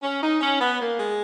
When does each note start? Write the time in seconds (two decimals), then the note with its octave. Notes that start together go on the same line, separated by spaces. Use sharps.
0.02 C#4
0.21 D#4
0.41 C#4
0.60 B3
0.80 A#3
0.99 G#3